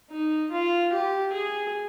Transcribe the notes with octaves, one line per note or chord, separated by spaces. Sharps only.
D#4
F4
G4
G#4